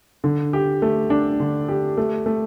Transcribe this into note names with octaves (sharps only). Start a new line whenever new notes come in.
D3
G4
A3
D4
D3
G4
A3
A3